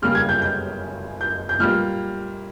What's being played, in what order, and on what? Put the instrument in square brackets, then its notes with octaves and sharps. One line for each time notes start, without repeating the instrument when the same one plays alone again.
[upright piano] C#3 G3 A#3 F6
G#6
G6
G6
G6
G6
A#2 G3 A#3 F6